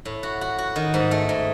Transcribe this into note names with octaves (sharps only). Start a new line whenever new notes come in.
A2
F#4
F#4
F#4
D#3
G#2
A3
G#2